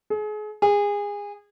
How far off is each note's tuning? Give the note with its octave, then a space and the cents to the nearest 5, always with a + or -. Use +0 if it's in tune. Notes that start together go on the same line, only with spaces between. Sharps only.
G#4 +35
G#4 -25